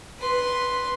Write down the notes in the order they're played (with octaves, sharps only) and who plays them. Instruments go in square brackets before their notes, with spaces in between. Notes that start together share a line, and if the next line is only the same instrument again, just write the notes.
[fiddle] B4 C6